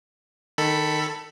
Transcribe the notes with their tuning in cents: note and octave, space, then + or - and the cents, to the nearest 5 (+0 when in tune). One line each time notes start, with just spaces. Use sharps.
D#3 -15 A4 +10 B5 +0